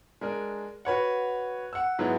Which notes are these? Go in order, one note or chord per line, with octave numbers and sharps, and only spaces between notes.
G#3 D4 A#4
F#4 B4 C#5 F#5
F#5 E6
G#2 F#3 G#3 B3 E4